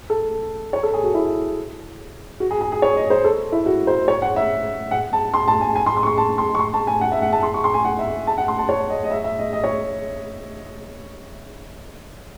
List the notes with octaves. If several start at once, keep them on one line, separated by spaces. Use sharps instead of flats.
A4
C#5
A4
G#4
F#4
E4
F#4
G#4
G#4
G#4
C#5
D#5
C5
A4
E4
F#4
C5
C#5
F#5
E5
F#5
A5
C6
A5
G#5
G#5
C6
C6
C#6
C6
A5
C6
C#6
C6
A5
G#5
F#5
E5
F#5
A5
C6
C#6
C6
G#5
F#5
E5
A5
F#5
C6
A5
C#5
D#5
D#5
E5
E5
D#5
D#5
C#5